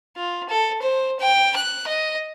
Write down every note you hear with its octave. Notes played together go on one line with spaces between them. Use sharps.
F4
A4
C5
G5
F#6
D#5